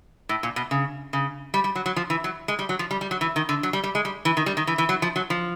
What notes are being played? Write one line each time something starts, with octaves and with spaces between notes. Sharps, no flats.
A2
A#2
B2
C#3
C#3
G3
G3
F#3
F#3
F3
E3
F#3
G#3
G3
F#3
F3
G3
G3
F#3
E3
D#3
D3
F#3
G3
G3
G#3
G3
E3
D#3
G3
D#3
E3
E3
F#3
F3
F#3
F3